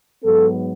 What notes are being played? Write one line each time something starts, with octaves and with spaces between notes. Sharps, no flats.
G#2 F#3 B3 A4